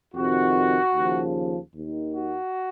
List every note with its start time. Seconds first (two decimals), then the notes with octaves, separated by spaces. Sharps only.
0.15 F2 C3 D#3 F#4
0.94 D#2 C#3 F3
1.74 D#2 D#3
2.13 F#4